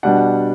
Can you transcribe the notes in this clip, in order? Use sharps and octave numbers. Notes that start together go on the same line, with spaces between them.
B2 G3 D4 F#5